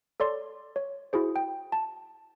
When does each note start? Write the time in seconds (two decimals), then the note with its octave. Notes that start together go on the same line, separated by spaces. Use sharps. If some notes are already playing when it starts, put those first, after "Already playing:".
0.20 A4 C#5 D5 C6
0.76 C#5
1.13 E4 F#4 G#4 C5
1.36 G5
1.72 A5